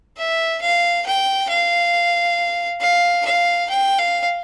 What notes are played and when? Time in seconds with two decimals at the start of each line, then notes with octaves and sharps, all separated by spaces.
0.17 E5
0.62 F5
1.06 G5
1.49 F5
2.81 F5
3.25 F5
3.70 G5
3.99 F5